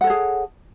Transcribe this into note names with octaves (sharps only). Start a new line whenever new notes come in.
G#4 A4 C#5 F#5